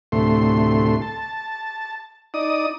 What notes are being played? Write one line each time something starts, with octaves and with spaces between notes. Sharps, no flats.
D2 A2 C3 A3 C6
A5
D#4 D5 D#6